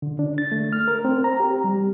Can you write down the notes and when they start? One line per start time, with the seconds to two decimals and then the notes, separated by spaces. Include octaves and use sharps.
0.02 D3
0.19 D4
0.38 A6
0.52 A3
0.73 F6
0.88 A#4
1.05 C4
1.24 A#5
1.40 G4
1.64 G3